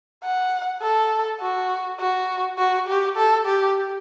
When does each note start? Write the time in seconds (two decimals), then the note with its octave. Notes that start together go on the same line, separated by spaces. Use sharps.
0.24 F#5
0.82 A4
1.41 F#4
1.99 F#4
2.58 F#4
2.88 G4
3.17 A4
3.46 G4